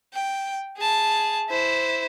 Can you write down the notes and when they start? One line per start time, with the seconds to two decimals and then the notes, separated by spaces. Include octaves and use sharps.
0.14 G5
0.78 G#4 A5
1.49 E4 C5